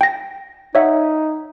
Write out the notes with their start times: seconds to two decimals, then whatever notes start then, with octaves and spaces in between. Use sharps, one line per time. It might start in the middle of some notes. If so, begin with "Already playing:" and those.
0.01 G5 A#6
0.75 D#4 C#5 E5 F#5